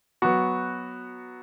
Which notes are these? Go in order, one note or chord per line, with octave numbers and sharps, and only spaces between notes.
F#3 B3 F#4